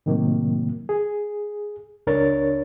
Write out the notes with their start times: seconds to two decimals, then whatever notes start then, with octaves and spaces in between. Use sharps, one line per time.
0.06 A2 C3 D#3 F#3 A#3
0.89 G#4
2.07 C#2 D4 A#4 C#5 A6